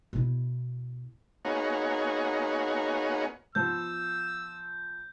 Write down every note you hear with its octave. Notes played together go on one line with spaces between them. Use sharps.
B2 E4
A#3 B3 D#4 F#4 G#4 C#5
F3 B3 E6 G6